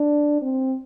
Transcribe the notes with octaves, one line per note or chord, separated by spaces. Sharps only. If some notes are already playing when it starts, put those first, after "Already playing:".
Already playing: D4
C4